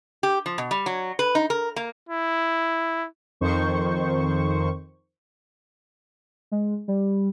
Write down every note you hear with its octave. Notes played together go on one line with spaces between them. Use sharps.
G4
F3
B2
G3
F#3
B4
D#4
A#4
A#3
E4
F2 D#3 C5 C#6
G#3
G3